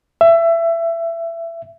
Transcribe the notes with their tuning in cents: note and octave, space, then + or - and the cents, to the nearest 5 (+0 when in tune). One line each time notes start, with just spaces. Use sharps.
E5 +20